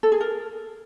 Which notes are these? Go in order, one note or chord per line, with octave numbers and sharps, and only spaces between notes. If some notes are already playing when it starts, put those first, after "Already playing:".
A4
G#4
A#4